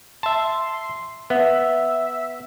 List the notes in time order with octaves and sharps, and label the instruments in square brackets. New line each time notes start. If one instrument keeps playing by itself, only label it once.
[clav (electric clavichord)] E5 A5 [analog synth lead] C6
[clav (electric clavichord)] B3 [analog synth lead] E5